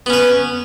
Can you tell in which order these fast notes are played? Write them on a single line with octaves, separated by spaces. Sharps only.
B3 C#4 B4